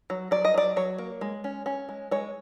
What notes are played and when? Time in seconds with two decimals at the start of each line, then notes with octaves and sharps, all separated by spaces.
0.10 F#3
0.31 F#3 D5
0.45 D#5
0.54 F#3 D5
0.76 F#3 C#5
0.98 A#3
1.21 G#3
1.44 C#4
1.66 C#4
1.89 G#3
2.11 G#3 C#5